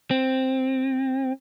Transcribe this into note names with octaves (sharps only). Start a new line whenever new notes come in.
C4